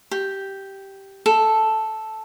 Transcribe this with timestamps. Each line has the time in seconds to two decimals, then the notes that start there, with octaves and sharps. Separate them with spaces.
0.11 G4
1.26 A4